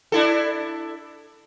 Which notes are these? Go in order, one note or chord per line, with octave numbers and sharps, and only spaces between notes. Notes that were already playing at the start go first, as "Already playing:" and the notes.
D4 E4 A4